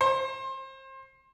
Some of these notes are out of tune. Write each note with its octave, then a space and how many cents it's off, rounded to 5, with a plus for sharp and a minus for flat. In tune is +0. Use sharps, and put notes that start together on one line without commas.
C5 +30